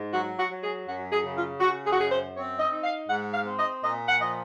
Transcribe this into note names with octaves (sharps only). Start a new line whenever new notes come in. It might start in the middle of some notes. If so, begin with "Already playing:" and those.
Already playing: G#2
F#3 F#4
F#4
F#3
G#4
F#2 F#4
G#4
C#3
F4
C#3 F#4
G#4
F#4
F#2 G#4
C5
C4 C#5
D#5
D#4
F5
G#2 F#5
F5
C4
D#5
A#2 D#5
F#5
F3 D#5